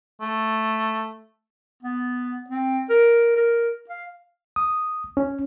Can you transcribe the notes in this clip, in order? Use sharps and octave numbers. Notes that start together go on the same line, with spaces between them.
A3
B3
C4
A#4
A#4
F5
D#6
C#4